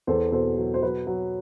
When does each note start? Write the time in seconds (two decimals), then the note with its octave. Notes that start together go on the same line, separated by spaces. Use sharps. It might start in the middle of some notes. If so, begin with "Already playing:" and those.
0.07 E2 A4 C5
0.32 B2 A4 C5
0.57 F#3
0.74 C5
0.83 F#3 B4
1.07 F#3